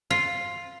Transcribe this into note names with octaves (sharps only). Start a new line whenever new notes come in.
F4